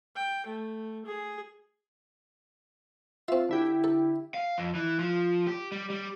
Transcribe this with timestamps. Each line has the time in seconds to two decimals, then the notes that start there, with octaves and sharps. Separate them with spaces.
0.16 G5
0.47 A3
1.06 G#4
3.28 C4 F4 E5
3.49 D3 E4 G4
3.84 A4
4.34 F5
4.58 F2
4.75 E3
4.99 F3
5.47 G4
5.72 G3
5.90 G3